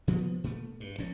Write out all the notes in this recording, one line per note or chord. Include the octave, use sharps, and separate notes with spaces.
A#2 F3 G3 B3
A#2 A3
G2
A#1 G#2 C#4